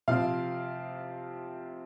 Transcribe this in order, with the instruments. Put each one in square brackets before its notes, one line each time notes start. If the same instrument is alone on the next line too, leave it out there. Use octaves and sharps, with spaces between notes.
[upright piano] C3 F3 C4 F5